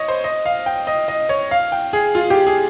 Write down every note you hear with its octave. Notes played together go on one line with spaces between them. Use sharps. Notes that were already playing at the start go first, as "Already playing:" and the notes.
Already playing: C#5 D#5
C5
D#5
F5
G5
D#5
D#5
C#5
F5
G5
G#4
F4
G4
G#4